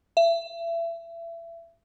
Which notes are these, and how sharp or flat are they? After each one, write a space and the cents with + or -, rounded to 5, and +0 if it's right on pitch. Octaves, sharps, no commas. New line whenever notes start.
E5 +30